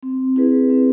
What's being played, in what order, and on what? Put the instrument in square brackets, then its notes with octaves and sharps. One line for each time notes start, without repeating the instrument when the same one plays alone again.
[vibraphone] C4
E4 G#4 B4
C4